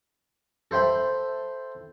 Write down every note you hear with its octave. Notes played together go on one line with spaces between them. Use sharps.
A4 C5 E5 G5 B5